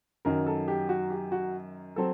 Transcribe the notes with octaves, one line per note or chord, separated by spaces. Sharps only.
F#2 D#3 F#3 A#4
A4
G4
F#4
G4
F#4
F#3 C4 A4